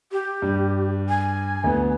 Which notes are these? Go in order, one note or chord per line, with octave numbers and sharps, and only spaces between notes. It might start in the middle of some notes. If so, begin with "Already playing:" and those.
G4
G2
G#5
D2 B3